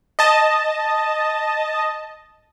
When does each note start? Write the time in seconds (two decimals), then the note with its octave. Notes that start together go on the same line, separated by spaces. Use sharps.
0.19 D#5 A5